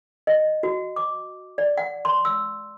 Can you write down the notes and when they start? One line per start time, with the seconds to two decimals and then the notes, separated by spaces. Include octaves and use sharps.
0.27 D#5
0.63 F#4
0.96 D6
1.58 D5
1.78 F#5
2.05 C6
2.25 E6